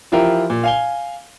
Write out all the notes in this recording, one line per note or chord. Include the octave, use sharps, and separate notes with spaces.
E3 F3 E4 F4 G4 A#4
A#2
F5 G#5 G7